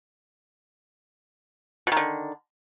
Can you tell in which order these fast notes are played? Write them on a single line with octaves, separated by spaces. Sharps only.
B2 D#3 D3